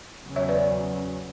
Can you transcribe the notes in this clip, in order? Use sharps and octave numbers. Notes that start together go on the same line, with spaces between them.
E2 C#3 F#3 C#4
C#5 E5
B4 D5